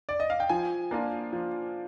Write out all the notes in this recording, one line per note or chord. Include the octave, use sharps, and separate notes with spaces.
D5
D#5
F5
G5
F3 G#5
A#3 D4 F4
F3